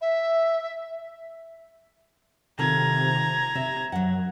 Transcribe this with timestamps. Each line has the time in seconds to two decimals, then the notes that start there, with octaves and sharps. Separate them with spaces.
0.01 E5
2.59 C3 D#3 F4 A4 A#5 G#6
3.55 C3 E5
3.92 F#2 F#3 F#5